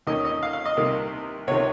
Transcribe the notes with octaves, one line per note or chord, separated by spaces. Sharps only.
D#2 D#3 A#3 C#4 D#5
D#5
F5
F5
D#5
C2 C3 D#3 A#3
C#2 C3 D#3 C#5